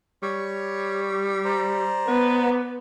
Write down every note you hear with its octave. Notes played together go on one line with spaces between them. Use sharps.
G3 C#5 C#6
C5 D5 A#5
B3 B4